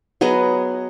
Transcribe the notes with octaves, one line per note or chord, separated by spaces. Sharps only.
F#3 B3 G#4 D#5